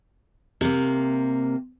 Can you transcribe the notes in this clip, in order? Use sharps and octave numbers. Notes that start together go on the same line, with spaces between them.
C3 A#3